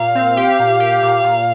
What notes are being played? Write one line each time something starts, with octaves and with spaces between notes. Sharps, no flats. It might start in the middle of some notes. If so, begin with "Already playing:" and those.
Already playing: A#2 F5
C4
G4
A#2
G4
A#2
A#2